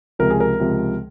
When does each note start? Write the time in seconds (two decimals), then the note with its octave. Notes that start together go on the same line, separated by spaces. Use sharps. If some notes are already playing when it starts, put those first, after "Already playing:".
0.19 C#2 C3 F3 A#4
0.30 G#4
0.40 A#4
0.60 C#2 C3 F3